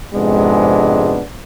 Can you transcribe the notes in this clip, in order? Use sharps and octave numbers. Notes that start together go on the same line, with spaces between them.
F2 G#2 C3 G#3 B3 D4